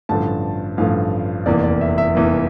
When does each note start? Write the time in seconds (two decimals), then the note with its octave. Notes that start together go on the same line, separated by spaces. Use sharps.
0.09 A1 G2 D3 F3 A3 A5
0.78 A1 G2 D3 F3 A3 F5
1.46 F1 E2 E3 A#3 D5
1.64 D5
1.81 E5
1.98 E5
2.15 F1 E2 E3 A#3